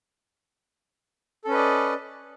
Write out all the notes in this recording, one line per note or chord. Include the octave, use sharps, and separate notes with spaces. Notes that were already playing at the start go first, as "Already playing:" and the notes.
C#4 A4 B4 D5 D#5